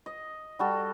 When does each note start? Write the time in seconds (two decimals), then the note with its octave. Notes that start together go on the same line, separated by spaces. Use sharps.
0.06 D#5
0.59 G3 F#4 A4